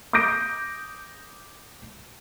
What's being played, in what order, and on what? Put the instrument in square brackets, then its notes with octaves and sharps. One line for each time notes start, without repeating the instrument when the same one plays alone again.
[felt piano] D6 D#6 G6 A#6 D7